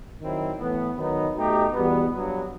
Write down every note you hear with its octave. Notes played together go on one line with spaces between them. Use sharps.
D#3 F#3 C4 E4
A2 E3 B3
D#3 F#3 B3 D#4
B2 A3 D#4 G4
E2 B2 G3 B3
G2 F#3 B3